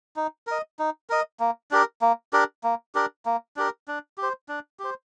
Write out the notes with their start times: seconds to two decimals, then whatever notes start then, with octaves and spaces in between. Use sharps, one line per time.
0.16 D#4
0.47 A#4 D#5
0.79 D#4
1.10 A#4 D#5
1.40 A#3
1.71 D4 G4 A#4
2.02 A#3
2.33 D4 G4 A#4
2.64 A#3
2.95 D4 G4 A#4
3.26 A#3
3.56 D4 G4 A#4
3.88 D4
4.18 G4
4.23 C5
4.49 D4
4.79 G4 C5